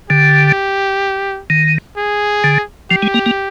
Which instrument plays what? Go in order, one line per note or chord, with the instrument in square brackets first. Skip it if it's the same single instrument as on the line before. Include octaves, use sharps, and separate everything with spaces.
[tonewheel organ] D3 [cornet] G4
[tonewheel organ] D#3
[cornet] G#4
[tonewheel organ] D3
[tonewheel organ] F3 [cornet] G4
[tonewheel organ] G#3
A#3
A#3